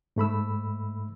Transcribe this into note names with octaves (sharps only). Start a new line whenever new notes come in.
G#2 A3 B5 E6